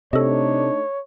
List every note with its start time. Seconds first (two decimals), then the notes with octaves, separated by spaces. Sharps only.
0.13 C3 A3 D4 D#4 A4 C#5 D#5